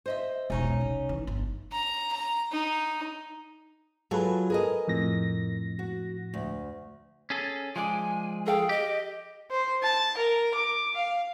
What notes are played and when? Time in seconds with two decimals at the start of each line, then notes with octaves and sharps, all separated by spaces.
0.06 C5 D#5 E5
0.50 E1 B1 C#4 D#4 C#5
0.81 C2
1.09 E3
1.27 G1
1.72 A#5
2.12 A#5
2.52 D#4
4.11 F#3 F4 G#4 A4 B4
4.50 G#4 A#4 D#5
4.88 F2 A2 A#6
5.79 F#4
6.34 D2
7.30 C#4 G#4 A4
7.76 F3 G#3 D5 G#5
8.46 G#4 A4 F5 G5
8.69 G4 D#5
9.51 C5
9.83 A5
10.17 A#4
10.55 D6
10.95 F5